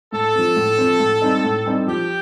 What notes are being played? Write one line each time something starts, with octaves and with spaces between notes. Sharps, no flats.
A2 A4
F3 C4
A2
F3 C4
A2
G3 C4 D#4
A2
G3 C4 D#4
F3 G4